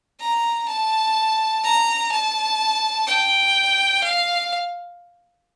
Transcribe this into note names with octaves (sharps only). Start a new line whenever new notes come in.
A#5
A5
A#5
A5
G5
F5